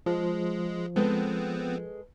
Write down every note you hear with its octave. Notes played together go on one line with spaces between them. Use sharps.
F3 G#3
G#3 B3 C4 A4 B4